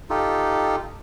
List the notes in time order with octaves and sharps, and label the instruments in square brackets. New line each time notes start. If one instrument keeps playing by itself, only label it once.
[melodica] D#4 F4 G4 A4